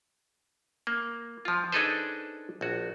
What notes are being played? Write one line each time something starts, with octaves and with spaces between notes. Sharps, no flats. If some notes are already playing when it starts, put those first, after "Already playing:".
A#3
F3 F4
D4 D#4 G#4 A4 B4 C5
A#1 F#4